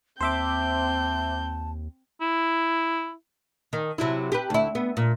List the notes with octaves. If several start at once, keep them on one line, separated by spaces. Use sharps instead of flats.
D#2 C4 C5 E5 A5 D6 G6
E4
D#3
C3 F#3 E4
G4 B4
D2 E4
B3
A#2